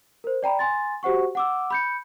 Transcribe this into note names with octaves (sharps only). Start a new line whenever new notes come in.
A#4 C5
D5 G5 A#5 B5
G#5 C6 A6
F#4 G4 C5 F#5 C#6
F#5 D6 E6
B5 G6 C#7